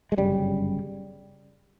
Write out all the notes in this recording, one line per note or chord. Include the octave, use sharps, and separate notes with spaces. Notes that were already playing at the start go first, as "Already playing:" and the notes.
G#3
G1 F#2 C#3 G3